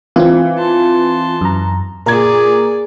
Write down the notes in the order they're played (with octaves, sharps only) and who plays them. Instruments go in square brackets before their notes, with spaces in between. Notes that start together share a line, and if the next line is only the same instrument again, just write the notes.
[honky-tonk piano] E3 [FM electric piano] C4 F4
[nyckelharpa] A5 C6
[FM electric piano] F#2 A#5
[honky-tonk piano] A#2 G#6 [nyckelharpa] G#4 D5 [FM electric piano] A#4 A#5